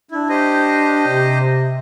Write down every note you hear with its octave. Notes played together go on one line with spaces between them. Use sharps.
D4 E4
G4 C5 D#5
C3